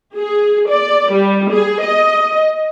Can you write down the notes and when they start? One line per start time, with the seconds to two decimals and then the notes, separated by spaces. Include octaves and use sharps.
0.16 G#4
0.68 D5
1.12 G3
1.52 G#4
1.83 D#5